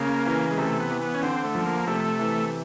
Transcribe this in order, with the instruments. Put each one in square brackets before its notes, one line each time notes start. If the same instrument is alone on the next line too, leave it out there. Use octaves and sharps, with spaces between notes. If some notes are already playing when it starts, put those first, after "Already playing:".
Already playing: [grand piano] C#3 [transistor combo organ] A#3
[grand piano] E3
[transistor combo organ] G#3
[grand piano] C3 [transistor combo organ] A3
[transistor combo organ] B3
[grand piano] E3
[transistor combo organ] B3
C#4
[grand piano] D3 [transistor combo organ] C4
[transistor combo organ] A3
[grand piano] F3
[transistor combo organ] A#3
[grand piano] C3 [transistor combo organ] A3
[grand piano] E3